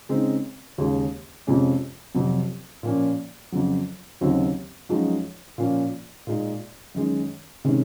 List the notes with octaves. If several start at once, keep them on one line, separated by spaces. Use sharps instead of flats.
C#3 G#3 C4 D#4
D#2 C#3 G#3
F2 C3 F3 G#3 C#4
F2 C3 F#3
A#2 F3 A#3 C#4
F2 C#3 F#3
D#2 C#3 F#3 C4 D#4
F#2 F3 G#3 D#4 F#4
A#2 F3 A#3 C#4
A#2 G#3 D#4
F#2 D#3 G#3
C3 D#3 G#3 C#4